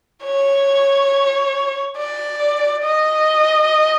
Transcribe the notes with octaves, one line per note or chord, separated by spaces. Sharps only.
C#5
D5
D#5